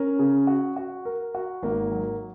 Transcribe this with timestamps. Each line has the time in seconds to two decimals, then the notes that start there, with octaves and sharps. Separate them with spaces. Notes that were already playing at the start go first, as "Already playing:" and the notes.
Already playing: C#4 A#4
0.19 C#3
0.47 F#4
0.76 F#4
1.05 A#4
1.35 F#4
1.62 G#1 A#3
1.92 F#3